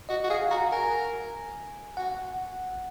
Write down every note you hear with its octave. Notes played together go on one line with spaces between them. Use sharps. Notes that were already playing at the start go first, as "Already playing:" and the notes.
F#4 D#5
F#4
G#4 F5
F#4 A#5
A#4 G#5
F#4 F#5